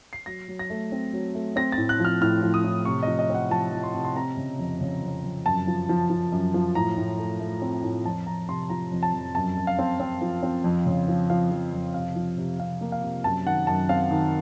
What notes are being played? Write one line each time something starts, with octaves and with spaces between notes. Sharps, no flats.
C7
F#3 A#6
F#3
A#6
A3
C4
F#3
A3
C4 A#6
A6
A2
F#6
F3 F6
A2 F6
F3
D#6
A2
C3 C#6
F3 D#5
D#5
C4
F#5
F3 A5
F3
C6
C3
C6
C4 A#5
C#3
F2
C#3
F2
F2
F#2 A5
F3
F3
F3
F#2
F3
A2 A#5
A2
A3
A3
C4
A2
F2 A5
F2 A#5
C3 C6
F3 A#5
F2
A5
F2
F#2 A5
F#2
F5
C4
C4
F3
C4
F2
C#3
F3
F3 F5
F3
F2
C3 F5
F3
C3
C3 F5
A#3
F5
C3
F#2 A5
D#3 F#5
F#2 A5
C4 F5
D#3